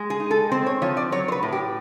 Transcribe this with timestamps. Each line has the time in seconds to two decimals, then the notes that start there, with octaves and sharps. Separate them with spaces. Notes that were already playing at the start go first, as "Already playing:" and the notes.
Already playing: G#3
0.10 G#4
0.20 D#4
0.31 A4
0.52 C4 C5
0.66 C#5
0.82 F3 C#5
0.97 D5
1.12 F#3 C#5
1.28 C5
1.32 B4
1.43 A2
1.52 G4